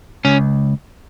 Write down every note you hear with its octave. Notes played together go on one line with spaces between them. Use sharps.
C#2 C#4